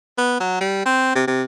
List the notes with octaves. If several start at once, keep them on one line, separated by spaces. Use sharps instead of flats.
B3
F#3
G3
C4
C3
C3